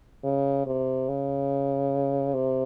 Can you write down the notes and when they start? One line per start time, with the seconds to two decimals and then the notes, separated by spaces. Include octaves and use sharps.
0.24 C#3
0.66 C3
1.09 C#3
2.34 C3